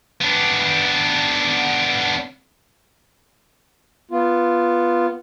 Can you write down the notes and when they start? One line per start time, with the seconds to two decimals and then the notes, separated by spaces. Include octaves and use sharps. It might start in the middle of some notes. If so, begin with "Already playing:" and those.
0.21 B3 D4
4.11 B3 F4